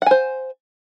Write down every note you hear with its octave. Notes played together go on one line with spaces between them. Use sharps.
C5 F#5 G#5